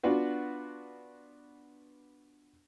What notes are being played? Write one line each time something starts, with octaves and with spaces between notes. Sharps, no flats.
B3 D4 F4 F#4 B4